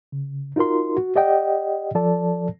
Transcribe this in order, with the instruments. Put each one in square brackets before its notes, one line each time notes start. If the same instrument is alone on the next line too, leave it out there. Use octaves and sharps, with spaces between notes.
[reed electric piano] C#3
D#4 F4 F#4 A#4 C6
F#4
G4 D5 D#5 F#5 G5
F3 A4 D5 A5